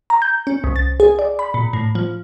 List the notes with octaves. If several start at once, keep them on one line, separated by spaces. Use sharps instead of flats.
A#5
G6
C#4
C2
A6
G#4
D5
B5
A#2
A2
F3